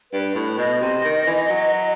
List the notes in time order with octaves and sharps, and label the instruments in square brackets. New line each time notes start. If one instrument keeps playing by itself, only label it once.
[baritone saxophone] G2 [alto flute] B4
[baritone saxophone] A2
[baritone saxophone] B2 [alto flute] D#5
[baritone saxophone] C3
D#3
E3
F#3